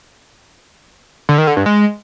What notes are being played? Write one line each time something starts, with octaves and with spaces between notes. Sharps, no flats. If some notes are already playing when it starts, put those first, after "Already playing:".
D3
D#3
D3
G2
G#3